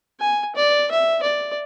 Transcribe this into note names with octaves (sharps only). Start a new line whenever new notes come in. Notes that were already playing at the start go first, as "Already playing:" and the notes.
G#5
D5
E5
D5